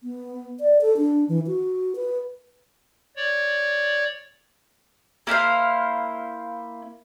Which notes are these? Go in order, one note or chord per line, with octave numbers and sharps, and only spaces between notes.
B3
D5
A4
D4
E3
F#4
B4
C#5 D5
A#3 E4 C5 F5